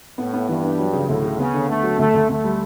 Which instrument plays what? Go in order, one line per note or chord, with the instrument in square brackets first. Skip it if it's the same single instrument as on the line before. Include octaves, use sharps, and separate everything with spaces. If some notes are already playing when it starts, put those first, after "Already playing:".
[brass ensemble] A2 [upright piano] B3
[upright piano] B3
[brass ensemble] G2 [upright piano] E3
[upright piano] D4
F#3
C#3
[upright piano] D2 [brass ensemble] A2
[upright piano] C#3
[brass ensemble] C#3 [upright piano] B3
[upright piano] D3
[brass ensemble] A3 [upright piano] B3
[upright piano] F#3
[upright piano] D2 [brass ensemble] A3
[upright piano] D2
[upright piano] D2 [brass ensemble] A3
[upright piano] G3